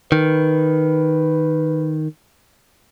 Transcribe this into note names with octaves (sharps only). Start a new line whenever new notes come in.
D#3 B4